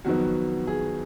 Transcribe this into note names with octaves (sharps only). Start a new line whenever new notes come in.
F2 D#3 F#3 B3 F#4
G#4